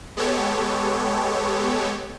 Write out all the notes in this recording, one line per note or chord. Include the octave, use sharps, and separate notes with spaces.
G#3 B3 G4 A4 C#5